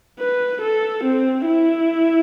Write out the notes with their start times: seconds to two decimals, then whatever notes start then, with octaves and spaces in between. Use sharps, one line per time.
0.19 B4
0.61 A4
1.03 C4
1.46 E4